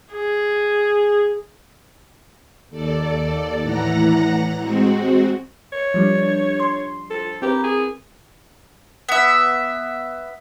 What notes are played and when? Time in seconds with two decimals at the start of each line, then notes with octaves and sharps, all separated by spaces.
0.14 G#4
2.70 D#2 A4 D5
3.62 A2 E3 F#5 A#5 A#6
4.59 G#3 C4 F#4
5.73 C#5
5.94 F3 G3 D4
6.60 C6
7.10 A4
7.42 C4 G4 A#4 B4
7.64 G#4
9.09 B3 E5